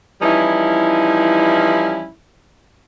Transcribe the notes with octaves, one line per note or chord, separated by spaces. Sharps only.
E3 F3 G3 C#4 D#4 E4